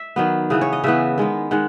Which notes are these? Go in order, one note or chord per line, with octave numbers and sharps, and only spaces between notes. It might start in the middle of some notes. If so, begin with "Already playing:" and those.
Already playing: E5
D#3 F#3 B3
C#3 E3 B3 G#4
C#5
D#5
C#3 E3 B3 E5
D#3 G#3 B3
D#3 G#3 F#5